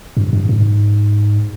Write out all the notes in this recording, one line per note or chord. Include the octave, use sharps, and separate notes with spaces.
G2
G2
G#2